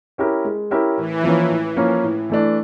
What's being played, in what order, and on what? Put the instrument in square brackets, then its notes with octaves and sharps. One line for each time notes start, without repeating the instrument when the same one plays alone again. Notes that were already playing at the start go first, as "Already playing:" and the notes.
[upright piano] C#4 E4 G4 A#4
G#3
C#4 E4 G4 A#4
[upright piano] A2 [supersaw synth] E3
[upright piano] F3 A#3 C#4
A2
F3 A#3 C#4
A2
E3 A3 D4